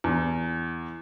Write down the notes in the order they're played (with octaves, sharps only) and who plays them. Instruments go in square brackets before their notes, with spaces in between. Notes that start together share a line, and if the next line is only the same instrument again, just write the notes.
[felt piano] E2